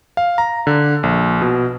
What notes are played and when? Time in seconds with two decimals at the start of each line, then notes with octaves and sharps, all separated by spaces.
0.17 F5
0.38 A#5
0.67 D3
1.03 A#1
1.41 B2